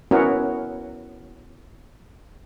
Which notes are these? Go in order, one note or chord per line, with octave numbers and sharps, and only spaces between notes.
B3 C#4 E4 F#4 A#4